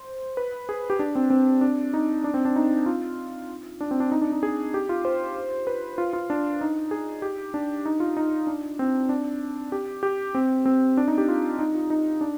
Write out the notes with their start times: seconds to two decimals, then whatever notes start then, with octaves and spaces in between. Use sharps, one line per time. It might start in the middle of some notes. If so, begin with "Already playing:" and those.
Already playing: C5
0.37 B4
0.69 G#4
0.90 G4
0.99 D4
1.15 C4
1.30 C4
1.61 D4
1.94 D#4
2.24 D4
2.34 C4
2.45 D4
2.56 D#4
2.86 F4
3.81 D4
3.91 C4
4.00 D4
4.12 D#4
4.22 D4
4.32 D#4
4.43 G#4
4.74 G4
4.89 F4
5.05 C5
5.67 B4
5.98 F4
6.13 F4
6.30 D4
6.61 D#4
6.91 G#4
7.22 G4
7.54 D4
7.86 D#4
8.00 F4
8.17 D#4
8.47 D4
8.79 C4
9.09 D4
9.72 G4
10.03 G4
10.35 C4
10.66 C4
10.97 D4
11.08 D#4
11.18 G4
11.28 F4
11.59 D#4
11.75 F4
11.90 D#4
12.21 D4